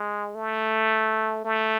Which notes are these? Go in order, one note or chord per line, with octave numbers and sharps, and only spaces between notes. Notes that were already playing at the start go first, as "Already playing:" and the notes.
Already playing: G#3
A3
A3